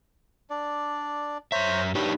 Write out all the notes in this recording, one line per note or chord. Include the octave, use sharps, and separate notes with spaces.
D4 D5
F#2 C5 C#5 E5 A#5
D4 D#4 G4 B4 C#5